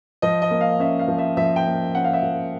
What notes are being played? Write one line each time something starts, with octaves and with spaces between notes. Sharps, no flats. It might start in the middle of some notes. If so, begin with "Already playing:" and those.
F3 D#5
D#5
A#3
F5
C#4 E5
F5
F3
E5
F3 E5
G5
A#3
C#4 F#5
F5
E5
F3